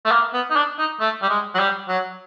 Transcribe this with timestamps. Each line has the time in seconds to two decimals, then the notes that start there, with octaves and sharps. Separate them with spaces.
0.05 A3
0.12 A#3
0.34 B3
0.50 D#4
0.56 D4
0.79 D#4
1.00 A3
1.22 G3
1.30 G#3
1.55 F#3
1.59 G3
1.88 F#3